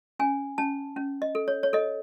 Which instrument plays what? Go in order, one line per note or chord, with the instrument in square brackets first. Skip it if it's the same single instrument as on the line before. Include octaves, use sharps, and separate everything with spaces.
[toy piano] C#4 G#5
C#4 A5
C#4
D#5
A4
C#5
C#5
A4 D#5